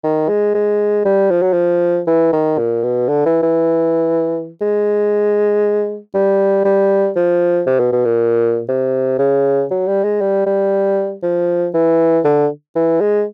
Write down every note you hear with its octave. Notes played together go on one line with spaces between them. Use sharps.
D#3
G#3
G#3
G3
F3
F#3
F3
E3
D#3
A#2
B2
D3
E3
E3
G#3
G3
G3
F3
C3
B2
B2
A#2
C3
C#3
F#3
G3
G#3
G3
G3
F3
E3
D3
E3
G#3